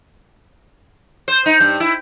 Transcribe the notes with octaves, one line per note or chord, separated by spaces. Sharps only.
C5
D#4
G2
E4